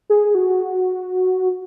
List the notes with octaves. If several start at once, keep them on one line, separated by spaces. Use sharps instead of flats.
G#4
F#4